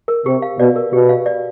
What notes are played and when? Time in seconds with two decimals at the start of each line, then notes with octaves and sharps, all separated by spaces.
0.08 A#4
0.25 C3 G4
0.42 F5
0.58 B2 D5
0.76 A#4
0.93 B2 G4
1.09 F5
1.26 D5